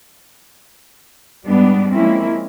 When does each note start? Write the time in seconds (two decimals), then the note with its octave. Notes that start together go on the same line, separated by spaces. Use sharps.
1.45 G#2 G3 B3 D4
1.93 F3 G#3 A#3 C4 C#4 E4